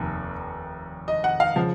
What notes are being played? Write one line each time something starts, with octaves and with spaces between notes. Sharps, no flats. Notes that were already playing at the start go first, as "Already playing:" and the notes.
Already playing: F1 D#2 D#3
D#5
F#5
F5
C#3 F3